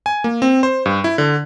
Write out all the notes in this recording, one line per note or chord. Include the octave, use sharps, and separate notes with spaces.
G#5
A#3
C4
C5
G2
E4
D3